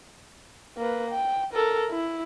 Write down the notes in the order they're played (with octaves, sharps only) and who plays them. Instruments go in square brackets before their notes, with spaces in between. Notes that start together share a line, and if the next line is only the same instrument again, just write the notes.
[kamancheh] A#3 B4
G5
A4 A#4
E4